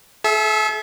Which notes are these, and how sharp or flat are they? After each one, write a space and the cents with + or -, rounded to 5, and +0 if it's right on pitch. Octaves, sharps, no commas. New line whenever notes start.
A4 -45 E5 +0